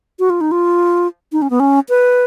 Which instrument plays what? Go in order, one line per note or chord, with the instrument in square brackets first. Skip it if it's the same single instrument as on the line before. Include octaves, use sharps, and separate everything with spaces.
[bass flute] F#4
F4
D#4
F4
D#4
C#4
B3
C#4
B4